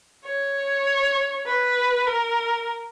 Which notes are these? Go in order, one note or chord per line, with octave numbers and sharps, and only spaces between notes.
C#5
B4
A#4